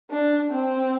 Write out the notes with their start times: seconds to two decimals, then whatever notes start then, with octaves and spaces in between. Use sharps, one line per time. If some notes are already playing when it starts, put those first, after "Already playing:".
0.11 D4
0.50 C4